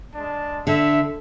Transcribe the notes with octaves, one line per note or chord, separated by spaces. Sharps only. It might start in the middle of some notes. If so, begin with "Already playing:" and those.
G#3 D4 A5
D3 E5